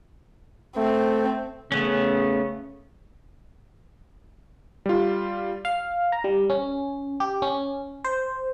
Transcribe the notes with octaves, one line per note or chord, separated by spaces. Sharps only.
A3 C4
C#3 A3 B3 C#4
G3 F4
F5
A#5
G3
C#4
G4
C#4
C5